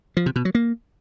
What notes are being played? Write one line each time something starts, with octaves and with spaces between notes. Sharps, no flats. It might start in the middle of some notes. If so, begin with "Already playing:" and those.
F3
C3
B2
F#3
A#3